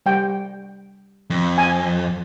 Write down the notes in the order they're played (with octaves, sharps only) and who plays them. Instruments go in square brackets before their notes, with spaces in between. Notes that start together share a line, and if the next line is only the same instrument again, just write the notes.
[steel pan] G3 G5
[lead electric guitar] F2
[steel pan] G#5